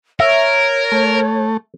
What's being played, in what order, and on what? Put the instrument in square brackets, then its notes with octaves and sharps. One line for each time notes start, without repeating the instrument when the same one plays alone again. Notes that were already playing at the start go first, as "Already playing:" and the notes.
[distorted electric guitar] A#4 [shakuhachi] C#5 [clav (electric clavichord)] E5
[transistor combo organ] A3